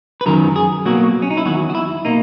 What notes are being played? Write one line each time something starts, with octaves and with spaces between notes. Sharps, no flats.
B4
F#2 D#3 F#3 A#4
G#4
B2 F#3 A#3 F#4
C#4
D#4
E4
E2 D#3 F#3 F#4
F#4
E4
B2 A#3 D#4